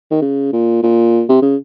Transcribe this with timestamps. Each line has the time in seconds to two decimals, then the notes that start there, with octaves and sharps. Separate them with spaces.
0.11 D#3
0.22 C#3
0.53 A#2
0.83 A#2
1.29 C3
1.42 C#3